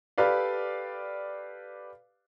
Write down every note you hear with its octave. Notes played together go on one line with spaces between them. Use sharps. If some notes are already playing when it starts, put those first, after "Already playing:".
G4 A4 B4 D5 F5